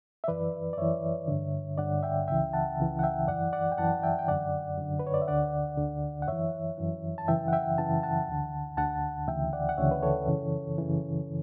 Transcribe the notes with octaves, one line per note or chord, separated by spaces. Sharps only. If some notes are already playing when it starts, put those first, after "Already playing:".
E5
F#2 E3 B4 D5
D5
F#2 E3 C#5 E5
G2 D3
G2 D3 D5 F#5
E5 G5
C#2 C#3 E3 E5 G5
F#5 A5
C#2 C#3 E3
F#5
E5 G5
F#2 E3 D5 F#5
D5 F#5
G5
F#2 E3 F#5 A5
E5 G5
G5
F#2 D3 D5 F#5
F#2 D3
B4
C#5
D5
E5
D2 D3 D5 F#5
D2 D3
F#5
F#2 E3 C#5 E5
F#2 E3
A5
F#2 C#3 E3 E5 G5
F#5
E5 G5
F#2 C#3 E3 A5
F#5 A5
D2 D3
D2 D3 F#5 A5
D2 C#3 E3 E5 G5
D5 F#5
F#5
D2 C#3 E3 C#5 E5
B4
A4 C#5
F#2 C#3 E3
F#2 C#3 E3